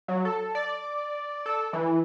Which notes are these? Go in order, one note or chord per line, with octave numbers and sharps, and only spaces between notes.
F#3
A4
D5
A4
E3